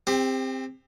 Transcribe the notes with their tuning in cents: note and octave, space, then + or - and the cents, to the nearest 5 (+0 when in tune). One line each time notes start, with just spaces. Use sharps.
C4 +0 G4 +35